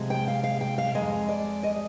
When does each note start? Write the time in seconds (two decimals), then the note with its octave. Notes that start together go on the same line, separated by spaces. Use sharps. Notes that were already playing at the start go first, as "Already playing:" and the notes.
Already playing: C3 F3 G#3
0.10 G5
0.28 F5
0.43 F5
0.61 G5
0.78 F5
0.95 D#3 G#3 D#5
1.00 F2
1.29 D5
1.63 D#5